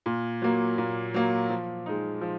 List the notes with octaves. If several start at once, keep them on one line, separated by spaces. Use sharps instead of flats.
A#2
F#3 A#3
A#2
F#3 A#3
F3
G#3 D#4
F3